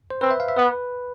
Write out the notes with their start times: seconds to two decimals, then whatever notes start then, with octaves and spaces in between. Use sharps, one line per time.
0.10 C5
0.21 C4 B4
0.31 E5
0.40 F5
0.48 E5
0.56 B3 B4